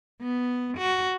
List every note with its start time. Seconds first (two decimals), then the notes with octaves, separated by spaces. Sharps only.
0.22 B3
0.78 F#4